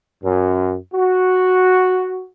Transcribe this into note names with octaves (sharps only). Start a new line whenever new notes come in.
F#2
F#4